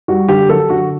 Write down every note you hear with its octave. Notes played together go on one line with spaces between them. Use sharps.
G3 F#4
D3 G4
F#3 A4
D3 F#4